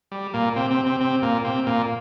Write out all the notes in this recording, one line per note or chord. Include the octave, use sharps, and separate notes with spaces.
G3
A#2 A#3
C3 C4
C3 C4
C3 C4
C3 C4
A#2 A#3
C3 C4
A#2 A#3